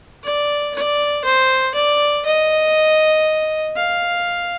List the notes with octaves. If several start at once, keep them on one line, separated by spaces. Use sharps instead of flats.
D5
D5
C5
D5
D#5
F5